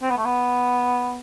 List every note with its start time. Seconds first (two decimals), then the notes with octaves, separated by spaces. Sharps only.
0.02 C4
0.10 B3
0.17 A3
0.25 B3